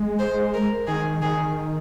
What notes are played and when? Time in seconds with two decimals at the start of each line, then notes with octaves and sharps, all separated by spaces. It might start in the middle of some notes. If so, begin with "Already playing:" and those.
Already playing: G#3
0.19 C5
0.53 A#4
0.87 D#3 G#4
1.22 D#3 G#4